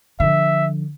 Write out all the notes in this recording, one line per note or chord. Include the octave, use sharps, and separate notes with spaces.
D3 F3 E5